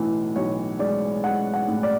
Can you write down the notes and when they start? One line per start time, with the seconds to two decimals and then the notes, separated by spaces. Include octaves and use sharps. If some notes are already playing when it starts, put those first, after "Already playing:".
Already playing: B1 A2 E3
0.36 B1 C#5
0.79 G#3 D5
1.24 G#3 F#5
1.54 F#5
1.68 A2
1.83 D5